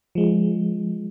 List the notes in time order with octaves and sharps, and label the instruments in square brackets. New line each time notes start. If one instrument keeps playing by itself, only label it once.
[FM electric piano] F3 G#3